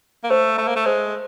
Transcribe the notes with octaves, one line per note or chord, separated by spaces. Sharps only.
A#3
A3 C5
A3 E5 A5
A#3
A3
G#3 C5